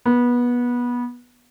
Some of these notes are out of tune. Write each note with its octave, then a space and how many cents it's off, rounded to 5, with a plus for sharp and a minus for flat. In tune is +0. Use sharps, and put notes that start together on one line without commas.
B3 -20